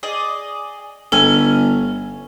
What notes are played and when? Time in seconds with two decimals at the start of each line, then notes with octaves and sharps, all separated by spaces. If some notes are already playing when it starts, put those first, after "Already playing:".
0.03 G#4 D5 D#5
1.12 G1 C#4 A4 G#5 F6